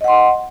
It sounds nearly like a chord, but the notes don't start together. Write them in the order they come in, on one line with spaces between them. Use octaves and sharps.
D#5 F#5 C6